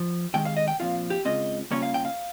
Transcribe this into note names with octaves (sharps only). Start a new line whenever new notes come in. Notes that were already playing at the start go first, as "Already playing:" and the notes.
Already playing: F3
C3 D#3 G#3 G5
F5
D#5
G5
A#2 F3 C4 F4 F5
G4
C#3 G#3 C4 F4 D#5
C#3 G3 A#3 C#4 F4 C#5
F5
G5
F5